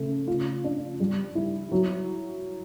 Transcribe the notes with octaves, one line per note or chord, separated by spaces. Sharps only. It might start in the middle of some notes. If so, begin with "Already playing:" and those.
Already playing: C#3 A3
F4
D4
G3
E4
F#3